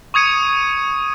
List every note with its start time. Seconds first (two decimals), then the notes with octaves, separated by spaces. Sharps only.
0.14 C#6 D#6 G#6 C#7 D#7